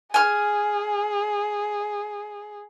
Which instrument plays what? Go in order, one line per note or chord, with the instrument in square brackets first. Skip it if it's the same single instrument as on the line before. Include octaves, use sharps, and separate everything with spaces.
[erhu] G#4 [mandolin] G#5 F6